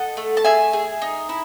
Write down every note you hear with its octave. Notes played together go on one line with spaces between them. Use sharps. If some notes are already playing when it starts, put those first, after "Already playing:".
Already playing: A4 D#5 F#5
A3
A5
G#4 E5 G#5
G#4
D#4
E4